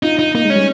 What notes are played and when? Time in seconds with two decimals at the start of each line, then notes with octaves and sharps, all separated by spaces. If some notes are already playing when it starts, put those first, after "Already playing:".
0.03 D#4 F4
0.19 D#4
0.35 A#3 D#4
0.45 G#3
0.50 C#4
0.55 G3